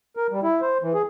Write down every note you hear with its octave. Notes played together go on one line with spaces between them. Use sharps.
A#4
G3
E4
C5
E3
G#4